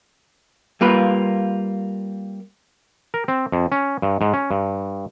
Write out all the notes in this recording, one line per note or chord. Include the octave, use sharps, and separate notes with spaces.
G3 A#3 F4 B4
A#4
C4
F2
C#4
G2
G#2
C#4
G2